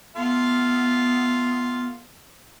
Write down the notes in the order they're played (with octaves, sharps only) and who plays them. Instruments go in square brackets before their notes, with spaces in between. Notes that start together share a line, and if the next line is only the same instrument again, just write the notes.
[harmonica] A3 F4 F5 [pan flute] B3